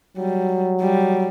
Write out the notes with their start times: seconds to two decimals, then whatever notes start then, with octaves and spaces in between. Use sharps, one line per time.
0.17 F#3 G3
0.81 G3